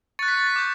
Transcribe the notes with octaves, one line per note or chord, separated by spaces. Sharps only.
C#6 F#6 A6 C#7
B6
A6
B6
D6 G6